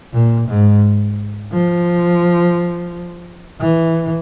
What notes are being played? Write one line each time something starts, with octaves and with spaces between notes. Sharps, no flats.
A#2
G#2
F3
E3